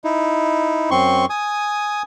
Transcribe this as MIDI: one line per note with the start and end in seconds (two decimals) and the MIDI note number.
0.04 0.90 63
0.04 0.90 64
0.91 1.26 42
0.91 1.26 60
0.91 1.26 84
0.91 1.26 85
1.30 2.02 80
1.30 2.02 87